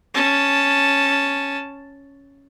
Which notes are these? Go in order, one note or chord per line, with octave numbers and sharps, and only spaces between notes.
C#4 A5